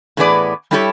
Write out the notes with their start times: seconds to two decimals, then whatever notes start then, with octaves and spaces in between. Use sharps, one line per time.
0.17 A2 E3 B3 G#4 B4 D5
0.71 G3 A3 E4 G4 A4 C#5